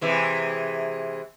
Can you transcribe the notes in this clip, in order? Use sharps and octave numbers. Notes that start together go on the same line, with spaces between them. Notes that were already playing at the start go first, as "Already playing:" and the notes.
C3 E3 G#3